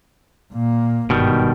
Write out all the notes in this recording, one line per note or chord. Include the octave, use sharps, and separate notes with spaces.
A#2 A#3
G1 G#2 B2 D#3 G3